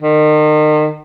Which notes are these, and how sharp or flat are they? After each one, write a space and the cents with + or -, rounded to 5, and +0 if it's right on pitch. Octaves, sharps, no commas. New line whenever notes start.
D#3 -35